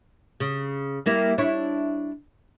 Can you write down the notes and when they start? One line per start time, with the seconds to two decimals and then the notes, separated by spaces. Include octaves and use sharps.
0.40 C#3
1.06 G3 A#3 E4
1.38 D4 E4 C#5